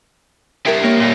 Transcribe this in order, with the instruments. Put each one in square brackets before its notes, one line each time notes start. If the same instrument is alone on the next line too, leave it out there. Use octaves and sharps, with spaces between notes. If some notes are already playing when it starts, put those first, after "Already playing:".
[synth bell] D4 A#4 C7 [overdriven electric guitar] E4 G4
[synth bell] A#3 C#5
[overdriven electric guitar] A#2 G3